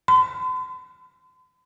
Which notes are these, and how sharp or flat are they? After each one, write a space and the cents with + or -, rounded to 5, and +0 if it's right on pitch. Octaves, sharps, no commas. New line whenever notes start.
C6 -45